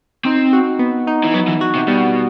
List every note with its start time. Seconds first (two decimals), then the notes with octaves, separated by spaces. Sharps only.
0.25 C4 D#4
0.53 F#4
0.79 B3
1.07 D#4
1.24 E3
1.34 F#3 B3
1.48 E3
1.61 F#4
1.75 C3
1.88 B2 G3